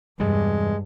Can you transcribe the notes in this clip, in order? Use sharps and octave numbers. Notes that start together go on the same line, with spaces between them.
E2 G2 C3 G3 G#3